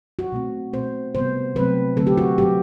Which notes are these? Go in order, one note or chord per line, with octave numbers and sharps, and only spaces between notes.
F#4
B2 A3 C4
B2 A3 C4 C5
C3 G3 B3 C5
C3 F#3 A3 C4 B4
D3 F#3 A3 C4 A4
G4
F#4
B2 F#3 C4 G4